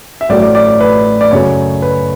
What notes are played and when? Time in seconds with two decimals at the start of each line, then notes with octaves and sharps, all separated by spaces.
0.21 E5
0.29 A1 A2 F#3 A3 D5
0.42 D5
0.55 D5
0.81 B4
1.21 D5
1.31 F#2 C#3 F#3 A3 C#5
1.82 B4